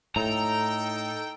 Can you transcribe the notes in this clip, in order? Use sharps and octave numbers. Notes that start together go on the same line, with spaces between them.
A2 D#4 A4 G5 A#5